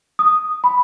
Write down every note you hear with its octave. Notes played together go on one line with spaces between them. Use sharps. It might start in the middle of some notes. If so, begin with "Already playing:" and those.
D#6
B5